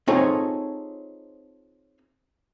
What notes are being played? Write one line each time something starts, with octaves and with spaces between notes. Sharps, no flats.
C4 D#4 F4 G#4 A4 C#5